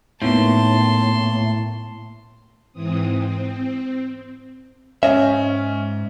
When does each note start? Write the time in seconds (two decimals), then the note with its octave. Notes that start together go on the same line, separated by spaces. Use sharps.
0.22 A2 A#3 B3 D#4 A5 C6
2.72 G#2 E3 C4 D#6
3.14 C4
5.03 G#2 C#4 D#5 E5